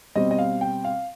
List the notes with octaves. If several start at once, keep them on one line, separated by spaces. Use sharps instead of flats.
B2 G3 C4 D#5
D#5
F5
G5
F5